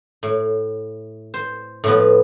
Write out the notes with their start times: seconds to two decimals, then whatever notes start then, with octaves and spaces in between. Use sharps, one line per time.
0.23 A2
1.34 C5
1.84 A2 F3 B3